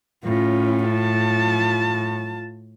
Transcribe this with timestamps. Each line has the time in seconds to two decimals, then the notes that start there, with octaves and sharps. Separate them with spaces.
0.25 A2 C#4 F4
0.88 F4 A5